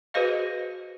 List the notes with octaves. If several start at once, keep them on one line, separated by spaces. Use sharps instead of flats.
F#4 G#4 B4 C5 D#5 F5